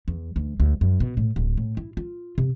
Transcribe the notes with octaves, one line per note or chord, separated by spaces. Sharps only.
E2
D2
D2
F#2
B2
A2
D1
A2
E4
F4
C3